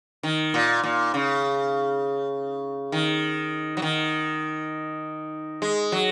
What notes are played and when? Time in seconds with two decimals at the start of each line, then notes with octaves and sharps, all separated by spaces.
0.23 D#3
0.54 A#2
0.84 A#2
1.14 C#3
2.92 D#3
3.77 F#3
3.82 D#3
5.62 G#3
5.92 F#3